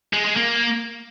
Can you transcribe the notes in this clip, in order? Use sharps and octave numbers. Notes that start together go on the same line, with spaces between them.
G#3
G#3
A#3